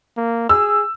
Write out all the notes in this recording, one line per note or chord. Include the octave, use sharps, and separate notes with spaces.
A#3
G#4 E6